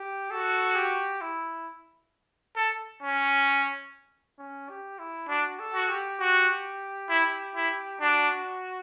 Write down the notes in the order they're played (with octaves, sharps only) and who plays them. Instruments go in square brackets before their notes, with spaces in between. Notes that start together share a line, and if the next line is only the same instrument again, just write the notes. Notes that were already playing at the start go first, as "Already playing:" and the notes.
Already playing: [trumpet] G4
[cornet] F#4 [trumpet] A4
[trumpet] G4
E4
[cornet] A4
C#4
[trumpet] C#4
G4
E4
[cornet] D4 [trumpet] F#4
[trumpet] A4
[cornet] F#4
[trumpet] G4
[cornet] F#4
E4
E4
[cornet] D4 [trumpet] F#4